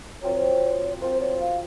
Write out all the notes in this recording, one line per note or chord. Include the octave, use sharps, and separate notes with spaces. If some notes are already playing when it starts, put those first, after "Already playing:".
F#3 C4 F4 A#4 C#5
F#3 C4 F4 A#4 C5
C#5
F5